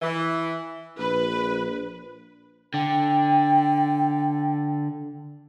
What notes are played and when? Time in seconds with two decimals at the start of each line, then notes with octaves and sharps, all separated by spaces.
0.02 E3
0.99 A#1 B4
2.74 D3 G5